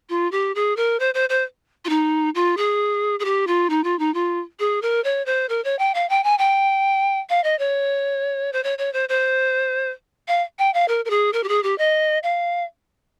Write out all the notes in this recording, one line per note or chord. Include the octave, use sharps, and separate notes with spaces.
F4
G4
G#4
A#4
C5
C5
C5
F4
D#4
F4
G#4
G#4
G4
F4
D#4
F4
D#4
F4
G#4
A#4
C#5
C5
A#4
C#5
G5
F5
G5
G#5
G5
F5
D#5
C#5
C5
C#5
C#5
C5
C5
F5
G5
F5
A#4
A#4
G#4
A#4
G4
G#4
G4
D#5
F5